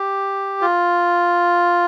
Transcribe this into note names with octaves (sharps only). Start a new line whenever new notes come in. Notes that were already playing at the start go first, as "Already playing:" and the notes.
Already playing: G4
F4